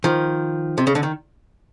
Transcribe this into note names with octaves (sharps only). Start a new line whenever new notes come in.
D#3 F3
C3
C#3
D3
D#3